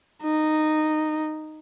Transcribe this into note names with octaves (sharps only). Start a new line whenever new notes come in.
D#4